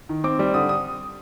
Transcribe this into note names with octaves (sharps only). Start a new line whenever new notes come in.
D#3
C4 D6
G3
D3 D#6
D#6